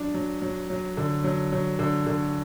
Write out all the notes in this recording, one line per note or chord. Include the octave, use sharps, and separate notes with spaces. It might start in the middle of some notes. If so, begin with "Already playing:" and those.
Already playing: F#3 D4
F#3
F#3
F#3
D3
F#3
F#3
D3
D3